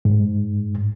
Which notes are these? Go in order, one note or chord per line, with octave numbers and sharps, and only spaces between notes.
G#2